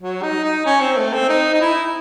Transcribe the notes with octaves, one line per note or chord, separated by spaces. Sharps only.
F#3
D#4
D#4
C#4
C4
A3
C4
D#4
D#4
E4